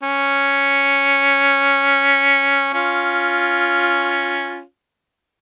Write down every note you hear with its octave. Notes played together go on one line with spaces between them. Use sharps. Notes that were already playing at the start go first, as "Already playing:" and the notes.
C#4
C#4 F4